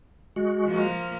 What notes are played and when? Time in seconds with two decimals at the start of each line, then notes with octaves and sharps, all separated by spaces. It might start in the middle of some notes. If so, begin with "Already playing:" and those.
0.36 G#3 F#4
0.67 F3 A#3